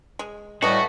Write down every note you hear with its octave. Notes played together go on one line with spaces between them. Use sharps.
G#3
A2 E3 G3 A3 F#4 D#5